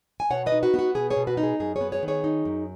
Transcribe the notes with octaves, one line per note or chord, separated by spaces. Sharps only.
G#5
B2 C#5 F#5
B4 D#5
D#4
F#4 B4
B3 F#4
B2 G#4
G#4 C#5
B2
F#4 B4
D#4
G#4
F#2 G#4
G#4 C#5
B3
G#4 C#5
D#3
G#4 C#5
D#4
F#2